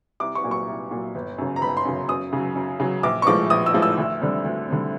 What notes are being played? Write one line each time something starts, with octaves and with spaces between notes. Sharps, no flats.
C2 D6
C#6
A#2 F#3
C#6
C2
A#2 F#3
G1
F#2 C#3
A#5
G1 B5
C6
F#2 C#3
F#2 D#6
C#3 F#3
F#2
C#3 F#3
A#1 D6
C#6
A2 F3 G#3 D6
A#1 D#6
E6
A2 F3 G#3
E6
D2
D3 G3 C4
D2
D3 G3 C4